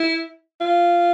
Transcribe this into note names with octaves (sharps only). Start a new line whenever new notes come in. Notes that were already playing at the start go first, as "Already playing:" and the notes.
Already playing: E4
F4